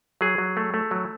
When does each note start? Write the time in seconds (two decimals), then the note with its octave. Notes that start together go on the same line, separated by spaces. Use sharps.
0.21 F#3 G#4
0.38 F#3
0.57 A3
0.74 A3
0.91 F#3